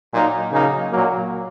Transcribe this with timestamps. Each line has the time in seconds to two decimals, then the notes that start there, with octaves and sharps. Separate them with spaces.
0.13 A#2 F#3 A#3 D#4
0.53 C#3 F#3 A#3 D#4
0.92 A#2 F#3 A#3